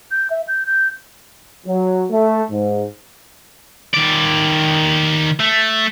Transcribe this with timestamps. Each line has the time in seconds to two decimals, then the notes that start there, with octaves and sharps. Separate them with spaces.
0.11 G6
0.30 E5
0.48 G6
0.66 G6
1.66 F#3
2.11 A3
2.51 G#2
3.94 D#3 D5
5.40 A3